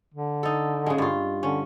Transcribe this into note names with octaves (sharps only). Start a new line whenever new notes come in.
D3
D#4 A4
C#3 G#3
G2 F4
D3 C#4